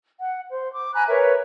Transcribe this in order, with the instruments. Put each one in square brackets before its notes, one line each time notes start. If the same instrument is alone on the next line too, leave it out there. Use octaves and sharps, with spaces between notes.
[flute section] F#5
C5
D6
G#5 A#5 B5 F#6
A#4 B4 C#5 E5